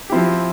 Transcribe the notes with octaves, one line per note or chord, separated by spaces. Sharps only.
F3 C4 E4 G4